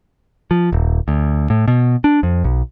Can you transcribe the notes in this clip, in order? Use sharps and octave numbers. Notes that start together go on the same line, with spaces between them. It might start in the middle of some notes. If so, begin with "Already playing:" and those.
F3
D#1
D2
A2
B2
D4
F2
B1